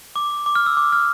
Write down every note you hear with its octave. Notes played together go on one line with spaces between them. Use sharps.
D6
D6
F6
E6
D6
F6